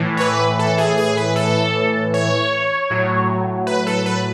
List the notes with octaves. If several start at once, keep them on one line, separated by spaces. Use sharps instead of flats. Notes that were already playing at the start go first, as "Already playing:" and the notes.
Already playing: A2 E3
C#5
B4
A4
G#4
G#4
B4
A4
C#5
A2 F#3
B4
A4
B4